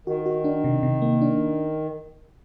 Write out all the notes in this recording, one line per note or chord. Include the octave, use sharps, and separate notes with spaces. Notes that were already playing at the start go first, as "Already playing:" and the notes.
D#3 F#4
F#4
D4
C3
C3
A#3
D4